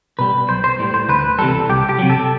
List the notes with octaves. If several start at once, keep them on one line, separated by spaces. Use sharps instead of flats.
B2 G3 B4
B1 C5
C5
A2 G3
C5
D2 B4
C3 E3 G3 A4
C2 G4
G4
C3 F#3
A4